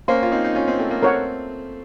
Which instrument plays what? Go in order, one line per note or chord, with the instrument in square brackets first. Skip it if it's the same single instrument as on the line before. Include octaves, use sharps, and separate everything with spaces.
[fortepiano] A#3 C#4 [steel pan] C5 F5 C6
[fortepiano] F4
C4 D#4
D#4
C#4 F4
C4 D#4
A3 C4
A#3
[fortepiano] A3 C4 [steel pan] A#4 C#5 F#5